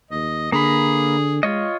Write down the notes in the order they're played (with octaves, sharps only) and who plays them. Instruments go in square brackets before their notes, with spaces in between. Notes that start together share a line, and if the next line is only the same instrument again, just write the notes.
[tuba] D#2 [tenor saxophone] D#5
[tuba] D3 [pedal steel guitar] A#3 A#5 B5 [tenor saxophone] G#4
[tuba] G#3 [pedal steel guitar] F4 C#5 D#5